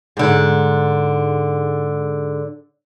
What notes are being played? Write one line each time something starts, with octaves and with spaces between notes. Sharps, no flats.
G#2 D3